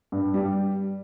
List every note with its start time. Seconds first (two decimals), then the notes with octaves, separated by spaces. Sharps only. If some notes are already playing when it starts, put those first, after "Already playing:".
0.12 G2
0.34 G3